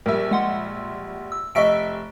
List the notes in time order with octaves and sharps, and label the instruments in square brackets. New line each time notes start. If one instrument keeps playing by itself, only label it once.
[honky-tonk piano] A#1 G3 E5 [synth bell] A#4
[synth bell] G#3 F#5 C6
E6
[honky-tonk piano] F1 E5 C#6 [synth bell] D#5 B6 D7